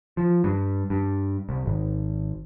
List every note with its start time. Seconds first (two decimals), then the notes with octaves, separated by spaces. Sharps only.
0.17 F3
0.44 G2
0.90 G2
1.49 C2
1.66 G#1